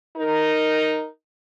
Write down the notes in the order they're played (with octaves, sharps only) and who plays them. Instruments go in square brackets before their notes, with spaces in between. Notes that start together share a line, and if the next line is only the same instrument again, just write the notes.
[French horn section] D#4 A#4